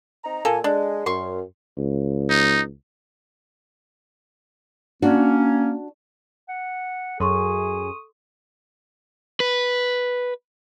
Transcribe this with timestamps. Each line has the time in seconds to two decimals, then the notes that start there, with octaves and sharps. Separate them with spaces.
0.24 C4 D#4 A#5
0.45 A#2 A#3 A4 G#5
0.64 G#3 D4
1.06 F#2 C6 C#6
1.77 C#2
2.30 D#4
5.02 A#3 C#4 D4 F#4
6.49 F#5
7.20 F#2 G#4 A4 C6 C#6 D#6
9.40 B4